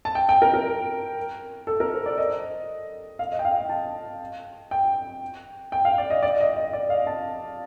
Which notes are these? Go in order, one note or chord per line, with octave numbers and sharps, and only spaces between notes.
A5
G5
G5
A#4
A#4
A4
A#4
C5
D5
D#5
F5
D#5
G5
F5
G5
A5
G5
G5
F5
D5
D#5
D5
D#5
D#5
D5
F5
A5